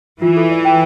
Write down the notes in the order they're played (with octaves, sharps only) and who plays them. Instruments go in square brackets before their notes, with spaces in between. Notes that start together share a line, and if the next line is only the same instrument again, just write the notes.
[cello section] E3 [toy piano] F4
[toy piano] A4
D5
G5